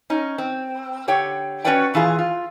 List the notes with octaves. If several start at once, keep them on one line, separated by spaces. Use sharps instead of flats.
C#4 D#4
C4
D3 G4 C#5 G5
C#4 F#4 B4 C#5 D5 G5
A#2 E3 F4 G#4
F4